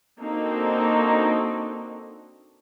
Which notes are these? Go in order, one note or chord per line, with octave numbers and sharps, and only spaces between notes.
A#3 C4 D4 D#4 F#4 A4